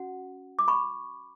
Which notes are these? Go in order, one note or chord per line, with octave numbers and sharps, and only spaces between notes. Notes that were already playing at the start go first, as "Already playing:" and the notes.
Already playing: C#4 F#4 F#5
D6
B5 C#6